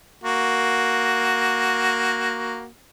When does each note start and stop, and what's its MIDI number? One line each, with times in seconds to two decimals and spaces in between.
0.24 2.66 58
0.24 2.66 66